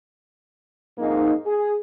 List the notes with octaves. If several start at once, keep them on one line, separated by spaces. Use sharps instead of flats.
F2 G#2 A#3 D#4
G#4